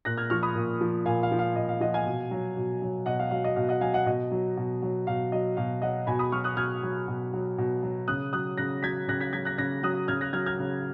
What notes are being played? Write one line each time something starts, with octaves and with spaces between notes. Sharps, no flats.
A#2 F#6 A#6
F6 G#6
F3 C#6 F6
B5 D#6
A#2
F3
A#2 F5 G#5
F5
F3
F5
A#2 D#5
F5
F3 D#5 F#5
F5 G#5
B2
F#3
B2
F#3
B2 D#5 F#5
F5
F#3 F5
D#5
B2 F5
D#5 F#5
F#3 F5 G#5
D#5 F#5
B2 D#5
F#3
B2
F#3
B2 F5
F#3 D#5
B2 F5
F#3 D#5 F#5
B2 G#5 B5
B5 D#6
F#3 C#6 F6
D#6 F#6
B2 F6 G#6
F#3
B2
F#3
B2
F#3
C#3 D#6 F#6
F#3 D#6 F#6
C#3 F#6 A#6
F#3 G#6 B6
C#3 F#6 A#6
G#6 B6
F#3 G#6 B6
F#6 A#6
C#3 F#6 A#6
F#3 D#6 F#6
C#3 F6 G#6
F#6 A#6
F#3 F6 G#6
F6 G#6
C#3